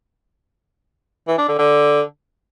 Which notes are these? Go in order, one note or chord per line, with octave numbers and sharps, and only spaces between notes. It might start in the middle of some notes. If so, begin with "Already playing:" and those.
E3
D4
D3
D3